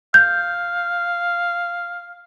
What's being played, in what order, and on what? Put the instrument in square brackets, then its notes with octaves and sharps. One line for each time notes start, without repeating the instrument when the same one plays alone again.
[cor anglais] F5 [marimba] G6